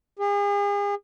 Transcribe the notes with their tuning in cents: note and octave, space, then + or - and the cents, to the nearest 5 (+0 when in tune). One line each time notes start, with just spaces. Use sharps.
G#4 -40